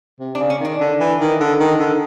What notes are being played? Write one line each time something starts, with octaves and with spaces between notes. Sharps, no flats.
C3
D4
C#3
C#4
D#3 D4
D3
E3
D#3
D3
D#3
D3